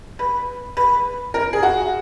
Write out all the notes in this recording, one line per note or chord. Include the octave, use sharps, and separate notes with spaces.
B4
B4
A#4
G#4
F#4